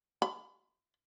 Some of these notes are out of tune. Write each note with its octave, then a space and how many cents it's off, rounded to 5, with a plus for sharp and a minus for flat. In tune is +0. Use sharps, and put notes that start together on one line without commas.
B5 +35